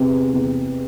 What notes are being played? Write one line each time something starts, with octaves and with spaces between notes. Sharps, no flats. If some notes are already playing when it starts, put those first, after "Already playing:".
Already playing: E2 C3
E2